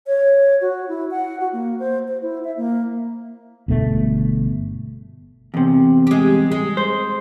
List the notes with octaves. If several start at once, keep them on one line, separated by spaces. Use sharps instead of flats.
C#5
F#4
E4
F#5
F#4
A#3
C5
C5
E4
E5
A#3
G1 B2 A3
E2 C3
G#3 G4
G#3
C5